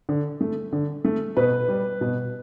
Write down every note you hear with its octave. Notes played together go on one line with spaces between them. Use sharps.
D3
A3
D3
A3
B2 B4
G3
B2